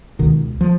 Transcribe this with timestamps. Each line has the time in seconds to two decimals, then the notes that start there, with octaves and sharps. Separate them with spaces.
0.19 C#2 B2 D#3
0.61 F3